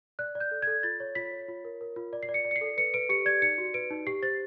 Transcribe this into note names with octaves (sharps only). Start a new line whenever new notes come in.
D5 F#6
D5
G6
A4
G#6
A4
F4 A6
C#5
F4 B6
C#5
F4
A#4
A#4
F4
D5
C7
D5
C#7
D5
C#7
C7
A4
B4 C#7
B4 D7
G4 C#7
D5 G#6
D#4 C#7
F#4
B4 D7
D#4
G4 C7
C5 A6